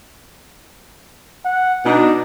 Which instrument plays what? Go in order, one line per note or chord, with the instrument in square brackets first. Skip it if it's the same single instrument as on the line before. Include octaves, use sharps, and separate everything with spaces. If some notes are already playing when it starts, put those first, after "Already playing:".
[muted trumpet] F#5
[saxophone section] B2 D4 [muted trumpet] D#4